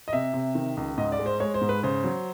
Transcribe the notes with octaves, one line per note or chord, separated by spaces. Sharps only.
D#5
C3 E5
C3
D#3
C#2
G#2 D#5
D5
G#3
C5
G#3 C#5
C5
G#2
B4
C#3 C5
F#3